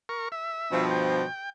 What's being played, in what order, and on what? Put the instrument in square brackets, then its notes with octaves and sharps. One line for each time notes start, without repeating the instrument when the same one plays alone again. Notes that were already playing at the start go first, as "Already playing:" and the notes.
[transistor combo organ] A#4 C#6
E5
[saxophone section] G2 B2 F3
[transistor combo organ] G5